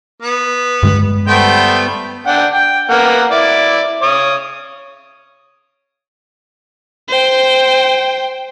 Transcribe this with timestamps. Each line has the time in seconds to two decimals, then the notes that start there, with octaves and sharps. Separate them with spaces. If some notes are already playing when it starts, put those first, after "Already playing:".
0.22 B3
0.83 G2 D3 G#3
1.28 G3 A3 B3 C5 G5
2.27 D4 F#5 G5
2.54 G5
2.90 A#3 B3 F#5
3.31 E4 D5
4.03 C#5 D#6
7.08 C5 G5